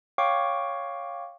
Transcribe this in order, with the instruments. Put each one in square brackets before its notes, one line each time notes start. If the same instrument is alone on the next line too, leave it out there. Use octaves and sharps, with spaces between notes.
[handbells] C#5 F5 G5 C#6 D6